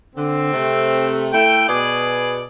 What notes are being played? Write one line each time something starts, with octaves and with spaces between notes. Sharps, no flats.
D3 C4
C3 A3
A3 E4 G5
B2 G#4 D5